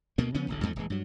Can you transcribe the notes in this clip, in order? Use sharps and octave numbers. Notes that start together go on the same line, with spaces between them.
D2 B2 A#3
C#3 F3 B3 C#4
D1 A1 D3
E2 G#2 F3 A3
D#1 E3 G#3
G2 F#3